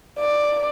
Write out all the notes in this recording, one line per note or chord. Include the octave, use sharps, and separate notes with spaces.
D5